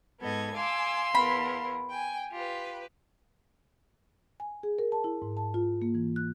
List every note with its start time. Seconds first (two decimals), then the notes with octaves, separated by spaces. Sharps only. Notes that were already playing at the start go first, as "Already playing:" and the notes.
0.21 G#2 B3 A4 D#5 G#6
0.55 F5 G#5 C6 D6 E6
1.15 E2 A#4 B5
1.90 G5 G#5
2.32 F4 G4 B4
4.40 G#5
4.63 G#4
4.79 A#4
4.92 A5
5.04 E4
5.22 G#2
5.37 A5
5.54 F4
5.82 A#3
5.95 E3
6.16 F#6